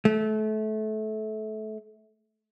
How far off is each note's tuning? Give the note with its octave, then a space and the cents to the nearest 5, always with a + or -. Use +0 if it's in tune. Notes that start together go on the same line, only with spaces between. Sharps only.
A3 -25